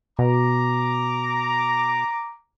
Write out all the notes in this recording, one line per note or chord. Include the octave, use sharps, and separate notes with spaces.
B2 A#5 D6